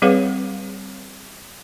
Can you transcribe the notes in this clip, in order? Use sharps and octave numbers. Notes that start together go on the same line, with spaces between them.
G3 C4 G#4 B4 C#5 F5